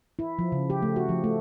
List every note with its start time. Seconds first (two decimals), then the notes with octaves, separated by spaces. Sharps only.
0.19 E4
0.39 F3
0.52 C#3
0.70 G4
0.82 A3
0.96 F#4
1.09 F3
1.24 A3